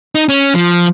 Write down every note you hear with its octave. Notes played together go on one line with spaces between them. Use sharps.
D#4
C#4
F3